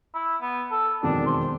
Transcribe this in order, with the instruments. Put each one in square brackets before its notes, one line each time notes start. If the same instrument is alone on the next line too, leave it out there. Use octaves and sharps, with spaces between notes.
[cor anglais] E4
B3
A4
[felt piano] E1 F2 D#3 [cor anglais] D4
[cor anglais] C5